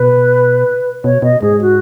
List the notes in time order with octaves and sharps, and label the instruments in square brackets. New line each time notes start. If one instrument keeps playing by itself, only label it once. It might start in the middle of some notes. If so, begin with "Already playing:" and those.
Already playing: [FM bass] B2 [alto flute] B4
[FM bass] B2 [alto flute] C#5
[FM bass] B2 [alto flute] D#5
[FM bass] G#2 [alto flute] G#4
[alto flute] F#4